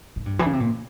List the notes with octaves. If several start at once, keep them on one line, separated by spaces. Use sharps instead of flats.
G#2
G2
E3
C#3
C3
A#2